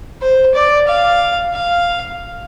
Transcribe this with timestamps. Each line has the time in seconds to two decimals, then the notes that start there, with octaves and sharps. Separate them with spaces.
0.22 C5
0.55 D5
0.88 F5
1.54 F5